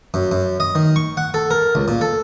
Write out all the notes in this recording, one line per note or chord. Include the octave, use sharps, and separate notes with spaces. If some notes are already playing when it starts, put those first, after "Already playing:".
F#2
F#2
D#5
D#3
C#6
F#5
A4
A#4
C#2
A#2
A4